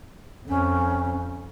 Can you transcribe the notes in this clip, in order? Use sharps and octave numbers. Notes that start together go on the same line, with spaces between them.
F2 C#4